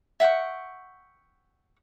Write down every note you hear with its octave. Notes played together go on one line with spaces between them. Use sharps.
E5 F#5 G5 C#6